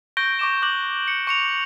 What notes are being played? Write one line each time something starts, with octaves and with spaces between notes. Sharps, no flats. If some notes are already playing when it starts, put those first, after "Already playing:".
C#6 G6 A#6 D7 G7
C#6 D6 E7
D6 F#6 A#6 F#7
C#7
C#6 C#7 F7